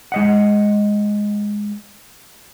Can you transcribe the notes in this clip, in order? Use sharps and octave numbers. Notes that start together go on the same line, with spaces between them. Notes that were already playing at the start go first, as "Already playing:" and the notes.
G#3 D#5 F#5